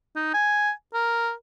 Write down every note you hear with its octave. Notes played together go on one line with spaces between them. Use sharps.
D#4
G#5
A#4